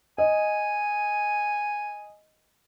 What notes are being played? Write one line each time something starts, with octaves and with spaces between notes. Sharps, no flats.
D#5 G#5